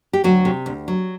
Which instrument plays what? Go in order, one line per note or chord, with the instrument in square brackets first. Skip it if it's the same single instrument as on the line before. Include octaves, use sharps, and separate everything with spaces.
[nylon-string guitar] G4
D2 F#3 F#4
C3
D2
F#3